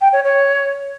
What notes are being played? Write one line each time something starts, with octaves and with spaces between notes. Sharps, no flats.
G5
C#5
C#5